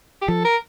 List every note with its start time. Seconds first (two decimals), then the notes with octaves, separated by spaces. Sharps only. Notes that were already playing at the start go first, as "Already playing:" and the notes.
0.22 G4
0.28 F3 A4
0.45 A#4